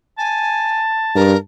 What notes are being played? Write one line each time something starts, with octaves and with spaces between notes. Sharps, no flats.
G#5 A5
G2 A#4